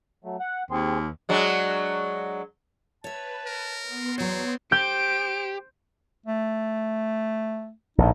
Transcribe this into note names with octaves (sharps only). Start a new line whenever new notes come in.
F#3 A3
F#5
D#2 C4 G#4 C6
F#3 G#3 D4
B4 C#5 E5 A5
A#4
B3 C6
E2 F#3 C4 C#5
G4 C5 G6 D7
A3
A#1 A2 D#4